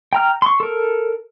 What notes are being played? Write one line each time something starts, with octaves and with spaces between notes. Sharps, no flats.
G5 A#5 F6
C6 C#6
A4 A#4